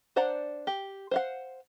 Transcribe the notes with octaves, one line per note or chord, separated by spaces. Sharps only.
D4 C5 D5 F#5 A#5
G4
C5 F5 F#5